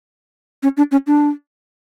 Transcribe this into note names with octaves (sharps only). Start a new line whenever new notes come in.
C#4
D4
C#4
D4